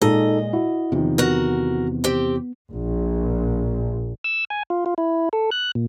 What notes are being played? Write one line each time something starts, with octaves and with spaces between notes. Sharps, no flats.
A#2 G#3 D#4 A4 D#5
E4 F#4
E2 C3 D#3 F3
B3 F#4 A#4
C4 G4
A#1
E6
G#5
F4
F4
E4
A4
F#6
A#2